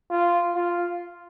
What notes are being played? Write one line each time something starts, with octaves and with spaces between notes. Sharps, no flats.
F4
F4